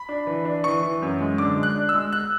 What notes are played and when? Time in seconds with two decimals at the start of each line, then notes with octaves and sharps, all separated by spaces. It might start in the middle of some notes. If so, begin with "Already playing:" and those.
Already playing: B5
0.09 D4
0.27 E3
0.45 D4
0.64 E3 C#6
0.83 E3
1.02 F#2
1.21 G#3
1.38 D3 D6
1.57 G#3
1.63 F#6
1.75 D4
1.89 E6
1.94 G#3
2.13 F#6